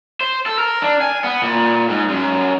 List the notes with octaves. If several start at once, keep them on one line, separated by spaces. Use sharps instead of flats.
C5
A4
A#4
D4
G#5
B3
A#2
G#2
F#2